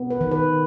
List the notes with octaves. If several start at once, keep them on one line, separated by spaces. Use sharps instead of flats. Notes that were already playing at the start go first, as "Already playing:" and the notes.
Already playing: B3
B4
D#3
B4